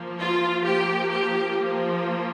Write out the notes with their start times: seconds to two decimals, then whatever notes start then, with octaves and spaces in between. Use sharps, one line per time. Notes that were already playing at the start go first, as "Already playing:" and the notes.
Already playing: F3 A#3
0.18 F4
0.65 F3 A#3 G4
1.12 G4
1.60 F3 A#3